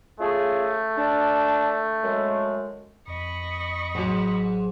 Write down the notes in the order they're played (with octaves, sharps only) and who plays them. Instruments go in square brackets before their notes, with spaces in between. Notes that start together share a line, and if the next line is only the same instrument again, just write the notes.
[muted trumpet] A3 [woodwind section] C#4 F4 G#4
[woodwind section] D4
F#2 G#3
[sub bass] F2 [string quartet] D#5 B5 C#6
[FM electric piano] A1 F#3 [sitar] G#2